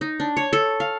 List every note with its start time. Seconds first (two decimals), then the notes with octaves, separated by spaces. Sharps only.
0.01 D#4
0.20 D4
0.37 C#5
0.53 A4
0.80 F5